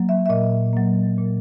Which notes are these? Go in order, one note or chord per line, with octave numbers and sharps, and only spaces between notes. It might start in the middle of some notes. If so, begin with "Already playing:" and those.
Already playing: F#3 A#3
E5
E5
A#2 D#5
F#3 A#3
A#2